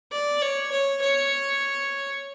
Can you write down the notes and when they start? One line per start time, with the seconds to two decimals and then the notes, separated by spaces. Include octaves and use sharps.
0.12 D5
0.42 C#5
0.72 C#5
1.02 C#5